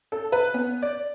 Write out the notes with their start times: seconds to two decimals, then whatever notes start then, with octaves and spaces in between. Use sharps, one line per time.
0.12 A4
0.32 B4
0.54 B3
0.82 D5